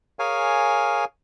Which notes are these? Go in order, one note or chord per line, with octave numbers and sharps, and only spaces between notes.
G#4 A#4 C#5 F5 G#5